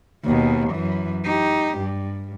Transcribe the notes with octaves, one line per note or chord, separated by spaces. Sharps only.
D#2 B2
F#2 E3
D#4 G4
G2